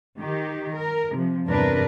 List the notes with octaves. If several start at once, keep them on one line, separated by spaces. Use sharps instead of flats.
D#3 G4
A#4
C3 F3
E2 G2 C3 D4 A#4 B4